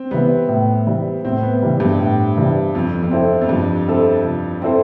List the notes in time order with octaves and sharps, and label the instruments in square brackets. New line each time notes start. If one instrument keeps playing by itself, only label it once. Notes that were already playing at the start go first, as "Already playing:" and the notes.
Already playing: [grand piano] C4
[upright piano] E3 G3 [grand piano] B3
[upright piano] A2
E3 G3
[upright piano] A2 [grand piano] C4
[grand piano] B3
[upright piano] E3 G3
[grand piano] G2
[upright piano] A2
E3 G3
[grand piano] F2 [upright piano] F3
[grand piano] F2
[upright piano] C4 E4 A4 C5
[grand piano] F2
[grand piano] G2 [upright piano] F3
[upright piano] C4 E4 A4 C5
F3
C4 E4 A4 C5